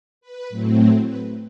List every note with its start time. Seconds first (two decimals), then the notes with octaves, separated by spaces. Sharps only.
0.21 B4
0.49 A2 F#3 A3 C4
1.06 B4